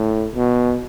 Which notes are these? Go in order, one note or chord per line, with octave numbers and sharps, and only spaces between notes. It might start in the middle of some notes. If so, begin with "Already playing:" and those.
Already playing: A2
B2